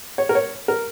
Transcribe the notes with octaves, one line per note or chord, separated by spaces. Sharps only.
C#5
A#4
C#5
A#4